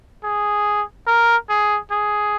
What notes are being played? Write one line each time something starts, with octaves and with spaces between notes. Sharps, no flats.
G#4
A#4
G#4
G#4